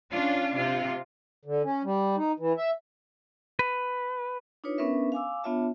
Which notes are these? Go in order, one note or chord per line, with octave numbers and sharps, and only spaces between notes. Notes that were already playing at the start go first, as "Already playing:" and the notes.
C#4 D4 F4
C3 F4
D3
C#4
G3
D#4
E3
E5
B4
D4 D#4 F4 B4 C#5
B3 C#4 D4 A#4 B4 E5
F5 G#5 D6 E6
B3 D4 F4 C#5 E5 A5